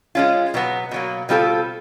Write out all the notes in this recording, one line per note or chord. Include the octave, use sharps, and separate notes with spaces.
G#3 C#4 F4
B2 F#3 B3
B2 F#3 A#3
B2 G3 C4 F4 A4